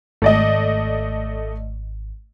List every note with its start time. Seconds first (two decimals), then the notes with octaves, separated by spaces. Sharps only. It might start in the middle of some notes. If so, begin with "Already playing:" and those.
0.22 G#1 A3 D5 D#5